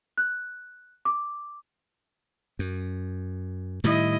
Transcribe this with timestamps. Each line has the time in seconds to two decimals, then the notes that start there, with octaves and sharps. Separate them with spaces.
0.18 F#6
1.05 D6
2.59 F#2
3.84 A2 D#3 G3 E4 D#5